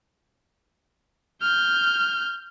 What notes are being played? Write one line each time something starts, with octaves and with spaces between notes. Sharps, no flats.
F6 G6